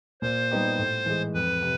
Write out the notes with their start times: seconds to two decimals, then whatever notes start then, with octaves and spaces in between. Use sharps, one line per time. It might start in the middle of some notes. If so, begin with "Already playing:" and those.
0.22 A#2 C5
0.51 G3 B3 D#4 G4
0.78 A2
1.06 E3 G#3
1.34 F2 B4
1.62 C3